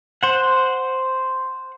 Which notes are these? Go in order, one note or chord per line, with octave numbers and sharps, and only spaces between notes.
C5 F#5